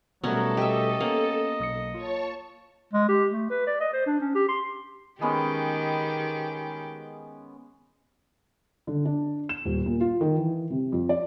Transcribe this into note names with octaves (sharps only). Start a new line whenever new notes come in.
B2 F#3 G3 A3 B3 C#4 A4 A#4
G4 D#5 E5
A#3 B3 C#4
B1 D#6 C#7
F4 C#5 A5 C#6
G#3
G4
A3
B4
D5
D#5
C5
D4
C#4
G4
C6
D#3 G#3 B3 C#4 G4
D3
D4
E7
D#1
A#2
F4
D#3
E3
C3
F2
D5